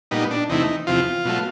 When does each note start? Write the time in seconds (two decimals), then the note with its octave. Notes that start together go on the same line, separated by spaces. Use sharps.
0.11 A#2 G3 B3 D#4
0.31 D4
0.49 E2 C3 E3 A3 D#4
0.87 E2 C3 F3 F4
1.25 B2 F#3 A3